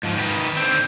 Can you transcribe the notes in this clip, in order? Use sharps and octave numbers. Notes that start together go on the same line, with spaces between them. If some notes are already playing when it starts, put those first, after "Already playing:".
G#2 F3
D#3 B4
D3 C4